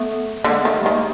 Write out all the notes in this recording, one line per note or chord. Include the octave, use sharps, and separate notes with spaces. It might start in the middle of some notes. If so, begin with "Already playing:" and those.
Already playing: A3 B3
D3 G#3 A#3
A3 B3
D#3
G3 A3
D#3
G#3 A#3